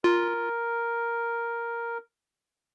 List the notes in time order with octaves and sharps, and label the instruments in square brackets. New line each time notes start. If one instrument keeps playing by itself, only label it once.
[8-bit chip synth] F4 [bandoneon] A#4